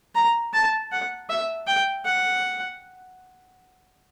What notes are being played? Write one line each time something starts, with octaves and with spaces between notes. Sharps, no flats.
A#5
A5
F#5
E5
G5
F#5